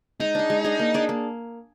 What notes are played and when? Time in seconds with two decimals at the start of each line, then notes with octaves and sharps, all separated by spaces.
0.20 G#3 D#4
0.35 D4 G#4
0.50 G#3
0.64 D4 G#4
0.79 A#3
0.94 D4 G#4 D5
1.09 A#3